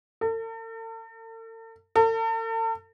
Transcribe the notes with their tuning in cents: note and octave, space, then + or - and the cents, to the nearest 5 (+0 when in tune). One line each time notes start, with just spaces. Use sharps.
A4 +45
A4 +45